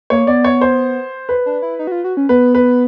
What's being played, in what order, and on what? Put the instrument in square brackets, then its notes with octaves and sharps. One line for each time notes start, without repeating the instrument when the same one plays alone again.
[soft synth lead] A#3 [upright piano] C#5
[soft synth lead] B3 [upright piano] D5
[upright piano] C#5
C5
B4
[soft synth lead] D4
E4
D#4
F#4
F4
F#4
C#4
[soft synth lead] B3 [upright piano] B4
[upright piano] B4